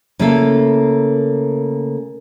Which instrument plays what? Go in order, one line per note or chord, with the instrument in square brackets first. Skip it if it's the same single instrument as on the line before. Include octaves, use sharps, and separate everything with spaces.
[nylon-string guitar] C#3 A3 A#3 E4 A4 F5